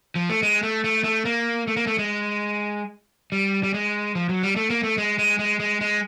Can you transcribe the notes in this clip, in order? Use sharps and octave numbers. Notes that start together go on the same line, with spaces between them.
F3
A3
G#3
A3
A3
A3
A#3
A3
A#3
A3
G#3
G3
G3
G#3
F3
F#3
G3
A3
A#3
A3
G#3
G#3
G#3
G#3
G#3